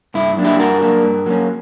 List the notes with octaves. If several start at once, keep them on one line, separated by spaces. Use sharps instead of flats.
G2 E4
F#3 A#3 D4
E4 G4
G2 F#4 A#4
F#3 A#3 D4
G2
F#3 A#3 C#4